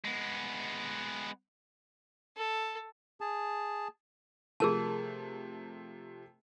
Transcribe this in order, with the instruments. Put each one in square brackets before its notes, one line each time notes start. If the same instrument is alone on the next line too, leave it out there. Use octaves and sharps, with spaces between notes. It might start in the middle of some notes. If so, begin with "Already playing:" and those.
[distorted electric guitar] G#3 B3
[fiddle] A4
[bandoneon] G#4 A5
[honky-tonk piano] C3 F3 A3 [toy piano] G#4 A#4 A5